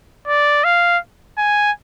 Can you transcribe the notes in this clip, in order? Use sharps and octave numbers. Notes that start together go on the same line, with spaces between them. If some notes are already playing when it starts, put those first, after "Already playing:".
D5
F5
G#5